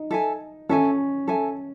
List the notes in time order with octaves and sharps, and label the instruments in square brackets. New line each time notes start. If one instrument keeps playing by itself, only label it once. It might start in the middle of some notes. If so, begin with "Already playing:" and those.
Already playing: [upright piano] D#4
[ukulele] A4 E5 G#5
[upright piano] C#4 [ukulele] A4 E5 G#5
[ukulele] A4 E5 G#5